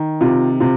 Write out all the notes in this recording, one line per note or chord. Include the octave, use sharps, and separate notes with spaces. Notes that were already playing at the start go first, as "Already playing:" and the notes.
Already playing: D#3
C3 F4
C3 F4